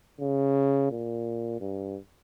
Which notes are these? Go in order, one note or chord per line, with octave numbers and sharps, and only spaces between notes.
C#3
A#2
G2